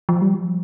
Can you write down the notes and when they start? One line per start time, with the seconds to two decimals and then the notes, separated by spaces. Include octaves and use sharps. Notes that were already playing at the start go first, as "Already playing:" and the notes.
0.09 F3
0.22 G3
0.35 F3